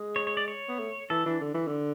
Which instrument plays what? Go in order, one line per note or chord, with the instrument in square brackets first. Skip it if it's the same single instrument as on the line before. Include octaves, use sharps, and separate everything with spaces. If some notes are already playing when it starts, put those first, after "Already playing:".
Already playing: [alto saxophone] G#3
[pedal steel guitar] C#5
C#5
D5
C#5
[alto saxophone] B3
A3
[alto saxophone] E3 [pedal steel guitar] A4
[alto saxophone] E3 [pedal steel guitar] D4
[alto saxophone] D3
E3
D3